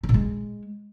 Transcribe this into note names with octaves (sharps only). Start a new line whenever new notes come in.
D3
A#2
G#3